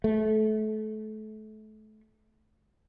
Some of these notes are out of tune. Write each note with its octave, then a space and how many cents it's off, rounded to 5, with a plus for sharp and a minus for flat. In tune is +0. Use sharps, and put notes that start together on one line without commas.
A3 -30